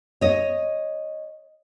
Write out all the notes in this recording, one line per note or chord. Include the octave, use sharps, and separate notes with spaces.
C#5 D#5